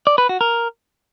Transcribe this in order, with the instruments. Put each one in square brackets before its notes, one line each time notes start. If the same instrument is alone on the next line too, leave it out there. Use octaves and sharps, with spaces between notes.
[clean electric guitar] D5
B4
F#4
A#4